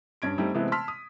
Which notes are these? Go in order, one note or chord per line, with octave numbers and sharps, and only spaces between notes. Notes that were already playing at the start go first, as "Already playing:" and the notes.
G2 C#4 G#6 D7
G3 A3 C4 D#4
C3 E3 G#3 A3 B3 C4
A5 C6 E6 F6 B6
D#6